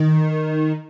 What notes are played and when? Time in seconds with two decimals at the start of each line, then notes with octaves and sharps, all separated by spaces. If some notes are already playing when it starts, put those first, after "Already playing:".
Already playing: D#3